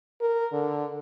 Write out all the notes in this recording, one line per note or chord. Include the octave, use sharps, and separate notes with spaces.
A#4
D3